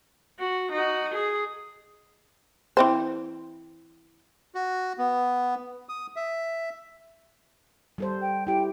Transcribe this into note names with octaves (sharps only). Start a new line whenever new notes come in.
F#4
D#4 F#4
G#4
E3 C4 C5
F#4
B3
D#6
E5
G3 A4 C5
G5
E4 G4 G5